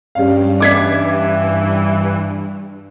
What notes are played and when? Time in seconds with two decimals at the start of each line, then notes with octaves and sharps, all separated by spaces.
0.15 G2 G3 C#4 F5
0.60 E3 D6 G#6 B6